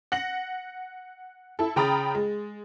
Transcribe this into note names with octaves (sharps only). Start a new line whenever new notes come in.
F#5 A#6 F#7
E4 A4
C#3 G5 A#5 B5 D#6 A6
G#3